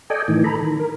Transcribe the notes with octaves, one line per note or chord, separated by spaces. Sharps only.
A4 D5 D#5 G5 G#5
A2 D#3 E3
A4 A#5 B5
D#3
A#4